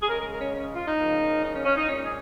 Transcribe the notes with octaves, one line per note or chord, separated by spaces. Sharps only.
G#4
C#3 G#3 A#4
A#4
A#4
C#4
C#4
F4
D#4
C#3 F3 A#3
D#4
C#4
C#4
D#4
A#2 G#3 C#4
G#4